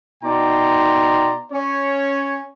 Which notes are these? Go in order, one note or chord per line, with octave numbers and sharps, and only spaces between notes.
B2 D#4 D5 G5 A#5 C6
C#4 C#5